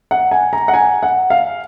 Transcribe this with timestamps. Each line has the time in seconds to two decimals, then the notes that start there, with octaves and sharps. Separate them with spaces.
0.11 F#5
0.31 G#5
0.53 A#5
0.68 F#5
0.74 G#5
1.03 F#5
1.30 F5